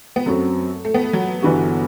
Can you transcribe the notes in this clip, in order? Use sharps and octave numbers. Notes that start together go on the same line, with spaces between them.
B3
F#2 F#3 A3 C4
A3
B3
A3
F#3
G1 G2 E3 B3 F#4